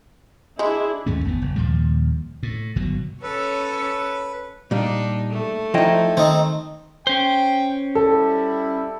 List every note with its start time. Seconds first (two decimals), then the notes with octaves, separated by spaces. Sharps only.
0.59 G#3 D4 E4 G#4
1.06 D#2 G#2 A3 C#4
1.24 G1 E2 B3
1.42 F#1
1.56 D#2 A#2 F3 G3
2.43 A2
2.76 G1 B2 F#3
3.22 C#4 A4 B4 C#5
4.71 A#2 G3 D4 D#4
5.31 A3
5.74 F3 D#4 E4 D#5 G5
6.17 D#3 C4 D#4
7.07 C#4 C5 G5
7.95 G3 E4 A4